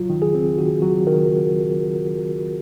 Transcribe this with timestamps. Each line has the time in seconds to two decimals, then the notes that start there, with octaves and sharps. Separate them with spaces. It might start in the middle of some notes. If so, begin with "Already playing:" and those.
Already playing: F#3 F4
0.10 D#3
0.22 G#4
0.34 C4
0.59 D#3 F#4
0.82 F#3 F#4
1.07 D#3 A#4